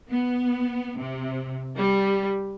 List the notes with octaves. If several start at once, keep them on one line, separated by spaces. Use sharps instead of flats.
B3
C3
G3